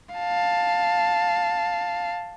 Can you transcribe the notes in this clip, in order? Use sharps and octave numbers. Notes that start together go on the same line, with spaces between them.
F5 A5